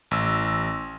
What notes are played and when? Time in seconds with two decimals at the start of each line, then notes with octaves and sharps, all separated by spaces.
0.11 A1 E6